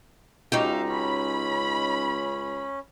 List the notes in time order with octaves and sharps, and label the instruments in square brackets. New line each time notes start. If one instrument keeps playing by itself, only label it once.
[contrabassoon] C#2 [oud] D#4 F#4 G4 [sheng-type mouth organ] E5 F5
[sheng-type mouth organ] C#4 [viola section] B5